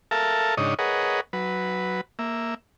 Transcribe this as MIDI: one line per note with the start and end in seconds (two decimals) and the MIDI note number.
0.11 0.55 69
0.11 0.55 70
0.11 0.55 76
0.11 0.55 77
0.11 0.55 81
0.57 0.74 44
0.57 0.74 49
0.57 0.74 62
0.57 0.74 63
0.57 0.74 73
0.57 0.74 75
0.79 1.21 68
0.79 1.21 70
0.79 1.21 71
0.79 1.21 73
0.79 1.21 75
0.79 1.21 78
1.33 2.01 54
1.33 2.01 71
2.19 2.54 58
2.19 2.54 76